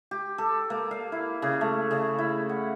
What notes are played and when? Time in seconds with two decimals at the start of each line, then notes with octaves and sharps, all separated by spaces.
0.11 G4
0.38 A4
0.70 A#3
0.91 F5
1.12 E4
1.42 C#3
1.61 A3
1.91 C#3
2.18 E4
2.49 F#5